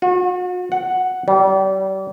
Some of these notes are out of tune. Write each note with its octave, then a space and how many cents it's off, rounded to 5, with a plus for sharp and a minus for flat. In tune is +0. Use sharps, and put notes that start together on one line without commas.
F#4 -40
F#5 +0
G3 -35